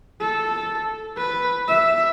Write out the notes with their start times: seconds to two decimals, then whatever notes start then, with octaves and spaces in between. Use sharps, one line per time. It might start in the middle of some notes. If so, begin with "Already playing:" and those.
0.20 A4
1.17 B4
1.68 E5